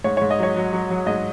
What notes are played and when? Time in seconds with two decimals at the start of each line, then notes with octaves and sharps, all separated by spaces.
0.04 G#2 C#5
0.17 C#5
0.22 G#2
0.31 D#5
0.39 F#3 C#5
0.56 F#3
0.73 F#3
0.90 F#3
1.07 G#2 D#5